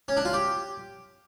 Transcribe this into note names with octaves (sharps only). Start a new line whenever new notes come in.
C#4
D4
F4
G4